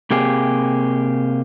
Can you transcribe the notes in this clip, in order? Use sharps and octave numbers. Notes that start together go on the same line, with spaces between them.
C3 A#3 G4 G#4